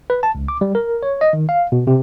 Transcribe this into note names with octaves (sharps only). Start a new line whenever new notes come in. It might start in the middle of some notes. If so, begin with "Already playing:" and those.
B4
A5
C#2
D6
G3
A#4
C#5
D#5
D#3
F5
B2
C3